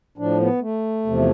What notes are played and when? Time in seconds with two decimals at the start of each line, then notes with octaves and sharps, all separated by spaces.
0.18 A2 F3 D4
0.40 B3
0.61 A3
1.06 E2 C3 F3